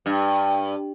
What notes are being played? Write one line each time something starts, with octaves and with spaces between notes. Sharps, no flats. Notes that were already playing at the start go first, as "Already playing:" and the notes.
G2